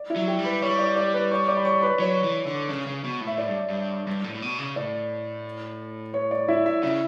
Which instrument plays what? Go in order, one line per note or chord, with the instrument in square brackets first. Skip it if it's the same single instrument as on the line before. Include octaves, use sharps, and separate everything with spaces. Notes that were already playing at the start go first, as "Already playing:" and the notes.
Already playing: [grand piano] D5
E4 E5
[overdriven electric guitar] F#3
[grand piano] G4 G5
[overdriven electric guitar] G3
[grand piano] B4 B5
[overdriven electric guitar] G3 [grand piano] C#5 C#6
[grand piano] D5 D6
D5 D6
B4 B5
C#5 C#6
D5 D6
B5
C#5 C#6
B4 B5
[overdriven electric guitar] F#3 [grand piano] C#5
[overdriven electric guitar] E3
D3
C#3
C#3
B2
A2
[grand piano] E5
[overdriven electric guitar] A2 [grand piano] D5
[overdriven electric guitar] G2
G2
G2
A2
A2
B2
C#3
[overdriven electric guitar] A2 [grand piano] D5
[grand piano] C#5
D5
E4 E5
E4 E5
[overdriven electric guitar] C#3 [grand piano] E4 E5